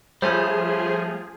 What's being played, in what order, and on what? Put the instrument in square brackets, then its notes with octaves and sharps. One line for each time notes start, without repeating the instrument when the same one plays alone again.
[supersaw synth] F3 G#4 [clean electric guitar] G3 A3 C#4 [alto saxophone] C5